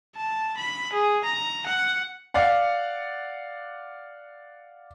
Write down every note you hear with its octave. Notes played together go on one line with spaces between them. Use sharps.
A5
B5
G#4
A#5
F#5
D5 F5 F#5